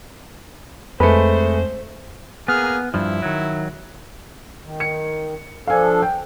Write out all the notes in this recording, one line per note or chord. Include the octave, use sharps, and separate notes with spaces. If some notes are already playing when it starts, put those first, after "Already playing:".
F2 G#3 A3 B4 C5
A#3 B3 G#4 F6
G2 F3 E4
D#3 F#3
D#3
C#7
F3 D4 A4 F5 G#5
G5